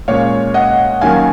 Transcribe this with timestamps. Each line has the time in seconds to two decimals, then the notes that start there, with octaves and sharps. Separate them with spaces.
0.08 A#2 G#3 C#4 C#5 F5
0.54 D#5 F#5
1.01 D#2 D#3 F#3 C#4 F5 G#5